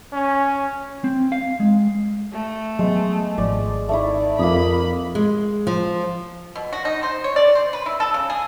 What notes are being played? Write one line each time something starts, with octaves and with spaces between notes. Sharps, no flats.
C#4
C4
F5
G#3
A3
F#3 G#3 B3 C6
G#1 F3 D5
A3 D#4 E4 D5
F2 A#3 B5 D#6
G#3
F3
B2
F#4
D#4
C5
C#5
D5
C5
B4
E4
A4
C#3
G#4